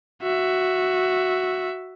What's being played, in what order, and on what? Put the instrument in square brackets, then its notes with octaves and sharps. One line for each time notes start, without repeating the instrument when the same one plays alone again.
[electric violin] F#4 E5